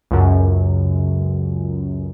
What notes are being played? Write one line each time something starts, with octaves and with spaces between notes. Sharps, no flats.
C#2 F#2